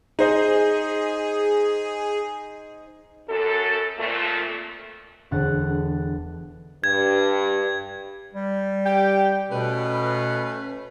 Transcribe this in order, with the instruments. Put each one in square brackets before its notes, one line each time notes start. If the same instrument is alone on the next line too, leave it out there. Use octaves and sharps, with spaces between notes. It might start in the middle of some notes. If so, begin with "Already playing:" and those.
[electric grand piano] D#4 C5 D#5 [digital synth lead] G#4
[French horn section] F#2 A4
F2 A#2 A3
[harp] E1 D3 F#5 A5
[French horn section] G2 [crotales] G#6
[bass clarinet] G3
[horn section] G4 G5
[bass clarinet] B2 [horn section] A3 C#4 B4